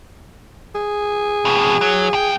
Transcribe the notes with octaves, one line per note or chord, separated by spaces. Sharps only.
G#4
F2 B2
F#3
F2 G5